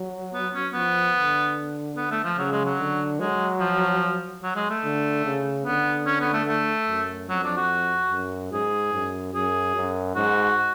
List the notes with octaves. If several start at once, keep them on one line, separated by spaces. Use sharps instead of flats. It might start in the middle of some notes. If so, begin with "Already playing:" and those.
Already playing: F#3
B3
C#4
F3 B3
D3
B3
A3
F3
C#3 F#3
G#3
F#3
D3
F#3 G#3
F3
F#3
G#3
A3
D3
C#3
D3 B3
C#4
B3
A3
A3
F#2
F2 F#3
D4
F#4
F#2
G#2 G#4
F#2
F#2 G#4
F#2
G#2 F#4